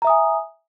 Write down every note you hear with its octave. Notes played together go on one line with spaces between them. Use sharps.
E5 G#5 A#5 D#6